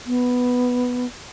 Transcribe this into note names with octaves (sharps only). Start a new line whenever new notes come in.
B3